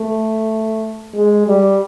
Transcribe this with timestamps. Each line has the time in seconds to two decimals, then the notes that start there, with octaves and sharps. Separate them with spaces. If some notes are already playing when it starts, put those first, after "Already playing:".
Already playing: A3
1.15 G#3
1.48 G3